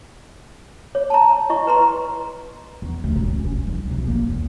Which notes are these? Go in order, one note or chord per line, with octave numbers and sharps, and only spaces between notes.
C#5
A5 A#5
E4 D#5 C#6
B4 A#5 C6
E2
D2
E1
C#4
C#4
C2
B1
A#3
E2